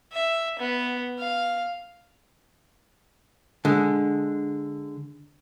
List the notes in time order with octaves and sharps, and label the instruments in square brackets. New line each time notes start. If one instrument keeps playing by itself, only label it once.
[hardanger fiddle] E5
B3
F5
[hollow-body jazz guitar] D3 G#3